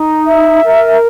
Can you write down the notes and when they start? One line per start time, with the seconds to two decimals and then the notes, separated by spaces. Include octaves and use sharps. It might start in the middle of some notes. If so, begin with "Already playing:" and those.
Already playing: D#4
0.26 E5
0.63 A#4